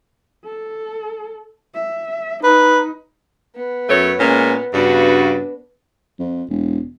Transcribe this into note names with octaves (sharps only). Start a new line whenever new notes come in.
A4
E5
D#4 B4
B3
F#2 A3 C#5
A#2 G#3 C#4
G2 C#3 B3 D4 F#4
F2
E1